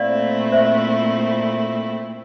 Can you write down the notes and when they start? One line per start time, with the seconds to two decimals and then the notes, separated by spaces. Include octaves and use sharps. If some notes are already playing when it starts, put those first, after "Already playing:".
Already playing: A#2 A3 C4 E4 D5 F5
0.52 C5 E5